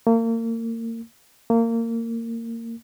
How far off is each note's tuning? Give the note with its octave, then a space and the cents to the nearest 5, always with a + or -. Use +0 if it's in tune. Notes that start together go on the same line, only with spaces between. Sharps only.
A#3 -35
A#3 -25